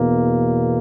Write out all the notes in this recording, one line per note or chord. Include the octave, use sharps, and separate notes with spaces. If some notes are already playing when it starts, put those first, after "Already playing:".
Already playing: E2 B2 A#3